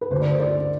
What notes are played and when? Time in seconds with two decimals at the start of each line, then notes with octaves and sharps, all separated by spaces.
0.01 B4
0.10 D2 D3 C5
0.21 D5
0.30 C5
0.40 D5